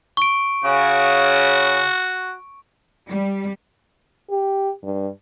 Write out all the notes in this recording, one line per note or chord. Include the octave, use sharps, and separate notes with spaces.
C#6 D7
C#3 F#4
G3
G4
G2